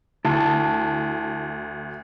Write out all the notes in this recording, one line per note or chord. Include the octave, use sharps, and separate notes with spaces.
D2 E4 A5